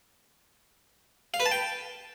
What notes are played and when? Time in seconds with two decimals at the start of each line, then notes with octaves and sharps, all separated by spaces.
1.34 F5
1.40 B4
1.46 A5
1.52 G5